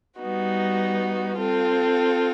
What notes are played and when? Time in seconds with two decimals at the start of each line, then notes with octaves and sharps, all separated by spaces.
0.19 G3 B3 D#4 F#4
1.38 C4 F4 A4